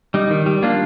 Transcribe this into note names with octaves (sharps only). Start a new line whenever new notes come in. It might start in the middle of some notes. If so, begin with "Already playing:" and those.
G3 D#4
D#3
G3
A#3 D4 F4